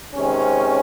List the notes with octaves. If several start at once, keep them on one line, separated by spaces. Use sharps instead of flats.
C3 D#3 G#3 C4 C#4